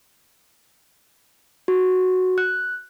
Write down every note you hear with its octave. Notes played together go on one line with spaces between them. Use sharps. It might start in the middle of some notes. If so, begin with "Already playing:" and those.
F#4
F#6